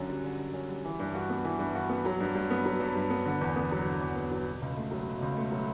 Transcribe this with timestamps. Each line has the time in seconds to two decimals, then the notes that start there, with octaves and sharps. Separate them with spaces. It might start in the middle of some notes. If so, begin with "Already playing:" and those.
Already playing: F#2 D3 C#4
0.09 G3
0.24 D3
0.38 F#2
0.54 C#4
0.69 G3
0.85 E3
1.00 G2
1.14 F#4
1.30 B3
1.45 E3
1.59 G2
1.75 F#4
1.89 B3
2.05 F#3
2.20 G2
2.35 G2
2.50 B3
2.65 F#3
2.80 G2
2.95 G2
3.10 B3
3.25 D3
3.41 E2
3.56 B3
3.71 F#3
3.86 D3
4.01 E2
4.16 B3
4.31 F#3
4.46 B2
4.62 C#2
4.77 A3
4.91 F#3
5.07 B2
5.22 C#2
5.37 A3
5.51 F#3